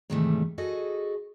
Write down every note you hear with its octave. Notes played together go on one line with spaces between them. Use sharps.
G#2 C3 D#3 E3 G3 A3
F#4 G#4 A4 D#5